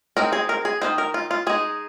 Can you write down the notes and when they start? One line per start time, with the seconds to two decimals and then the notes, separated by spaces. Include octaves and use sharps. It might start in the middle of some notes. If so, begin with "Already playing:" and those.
0.17 G#3 C4 D#4 A#4
0.33 G#4
0.49 A#4
0.65 G#4
0.81 D#3 C4 D#4 C5
0.98 A#4
1.14 F4
1.31 F4
1.47 G#3 D#4 G#4